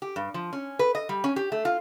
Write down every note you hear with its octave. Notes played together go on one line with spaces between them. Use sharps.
G4
G2
F3
C#4
B4
D#5
G3
C#4
G4
A3
F4